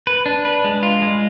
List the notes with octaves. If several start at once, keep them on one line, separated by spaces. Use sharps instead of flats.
B4
D4
B4
G#3
F4
G#3